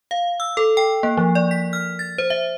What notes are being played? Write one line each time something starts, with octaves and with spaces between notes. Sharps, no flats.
F5
E6
A4
G5
A#3
F3
D5
B6
F6
A6
C5
E5